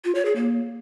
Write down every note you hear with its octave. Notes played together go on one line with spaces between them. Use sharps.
F4
C#5
G#4
A#3